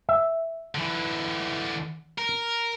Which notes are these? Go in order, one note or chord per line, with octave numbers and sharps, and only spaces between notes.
E5
D3 E3
A#4